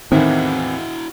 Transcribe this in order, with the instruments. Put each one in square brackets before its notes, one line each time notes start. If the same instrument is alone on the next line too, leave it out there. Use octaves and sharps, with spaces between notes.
[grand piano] E2 A2 E3 [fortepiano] D#3 [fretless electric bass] C4 [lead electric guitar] E4 F#4